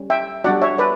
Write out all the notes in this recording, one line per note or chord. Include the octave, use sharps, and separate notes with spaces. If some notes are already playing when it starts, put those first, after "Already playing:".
Already playing: G3 C#4
E5 G5
G3 D4 F#4 D5 F#5
C#5 E5
B4 D5